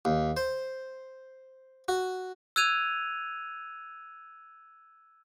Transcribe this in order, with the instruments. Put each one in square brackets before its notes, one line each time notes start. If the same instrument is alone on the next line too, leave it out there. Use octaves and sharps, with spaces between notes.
[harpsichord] D#2
C5
F#4
[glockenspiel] E6 F#6 G#6 D#7 F7